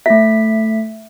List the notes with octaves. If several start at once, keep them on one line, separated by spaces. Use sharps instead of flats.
A3 E5 B6